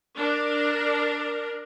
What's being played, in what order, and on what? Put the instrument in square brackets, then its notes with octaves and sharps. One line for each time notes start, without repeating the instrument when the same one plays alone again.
[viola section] D4 A#4